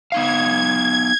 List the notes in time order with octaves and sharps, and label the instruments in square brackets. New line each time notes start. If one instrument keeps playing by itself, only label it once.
[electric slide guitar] B3 D#4 F5 [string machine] G#6